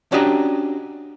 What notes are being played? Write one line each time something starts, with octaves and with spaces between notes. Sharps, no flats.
C#4 D4 F#4 G4 D#5 A#5